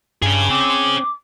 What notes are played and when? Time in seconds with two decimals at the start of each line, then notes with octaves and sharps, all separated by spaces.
0.22 G2 C#4 G#4
0.50 C4 D6